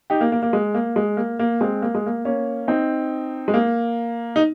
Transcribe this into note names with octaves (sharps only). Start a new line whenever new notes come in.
D#4 G4
A#3
A#3
A#3
G#3
A#3
G#3
A#3
A#3
G#3 C4
A#3
G#3
A#3
A#3 C#4
C4 D#4
G#3
A#3
D#4